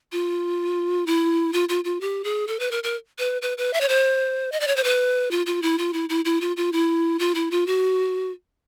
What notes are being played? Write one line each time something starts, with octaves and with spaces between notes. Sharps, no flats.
F4
E4
F4
F4
F4
G4
G#4
A4
B4
A#4
A#4
B4
B4
B4
E5
C#5
C5
D#5
D5
C#5
C5
B4
F4
F4
E4
F4
E4
E4
E4
F4
F4
E4
F4
E4
F4
F#4